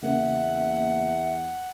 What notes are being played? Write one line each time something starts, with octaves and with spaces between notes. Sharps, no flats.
E2 C#3 A#3 E5 F#5